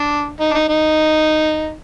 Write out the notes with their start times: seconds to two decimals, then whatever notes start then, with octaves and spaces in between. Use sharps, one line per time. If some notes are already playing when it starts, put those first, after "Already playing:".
Already playing: D4
0.40 D#4
0.51 D4
0.54 D#4
0.69 D#4